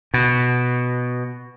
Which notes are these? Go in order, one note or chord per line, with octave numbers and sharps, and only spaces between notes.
B2